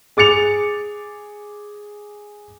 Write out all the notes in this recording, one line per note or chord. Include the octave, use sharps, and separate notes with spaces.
G#4 D6 A6 C#7 F7